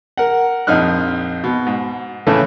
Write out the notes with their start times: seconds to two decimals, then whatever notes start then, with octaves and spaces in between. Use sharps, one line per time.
0.17 A#4 F#5
0.67 A#1 F2 D#4 F6 F#6
1.44 B2
1.66 G#2
2.27 A2 C#3 E3 A3